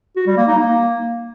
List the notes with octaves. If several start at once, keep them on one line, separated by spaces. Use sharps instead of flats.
F#4
G3
A#3
D#4
A#3